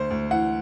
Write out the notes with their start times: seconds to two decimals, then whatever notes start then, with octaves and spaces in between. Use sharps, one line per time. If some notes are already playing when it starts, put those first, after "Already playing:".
Already playing: D2 C5
0.10 D2
0.31 E3 F#5